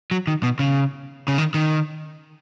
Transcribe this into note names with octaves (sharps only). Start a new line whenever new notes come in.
F#3
D#3
B2
C#3
C#3
D#3
D#3